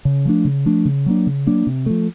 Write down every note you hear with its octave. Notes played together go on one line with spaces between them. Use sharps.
C#3
F3 A3 D4
C#3
F3 A3 D4
C#3
F#3 A#3 D4
C#3
F#3 A#3 D4
C3
F3 A3